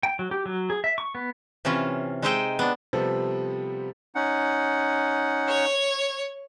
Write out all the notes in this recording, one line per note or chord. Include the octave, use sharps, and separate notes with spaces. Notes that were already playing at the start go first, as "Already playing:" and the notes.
G5
F#3
G4
F#3
G#4
E5
C#6
B3
C3 E3 C#4 F4
G#3 D#4 C5 D#5 E5 G5
B3 D4
C3 F3 G3 B3 C4 A4
C#4 D#4 F#5
C#5